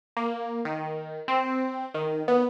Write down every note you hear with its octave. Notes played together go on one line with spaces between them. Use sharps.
A#3
D#3
C4
D#3
B3